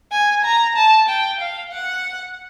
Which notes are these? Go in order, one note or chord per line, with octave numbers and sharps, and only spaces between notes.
G#5
A#5
A5
G5
F5
F#5